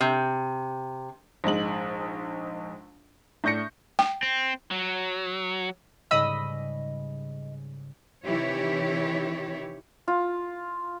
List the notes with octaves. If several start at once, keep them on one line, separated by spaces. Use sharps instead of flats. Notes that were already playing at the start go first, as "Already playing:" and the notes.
C3
A#1 G#2 G#3 F#7
A2 D4 G6 A#6 C#7
G5
C4
F#3
G#2 C#3 G3 D#5 B5 E6
C3 D#3 E3 E4 G4 C#5
F4